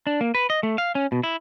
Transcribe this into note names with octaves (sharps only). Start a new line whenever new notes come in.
D4
A#3
B4
D#5
A3
F5
C#4
B2
E4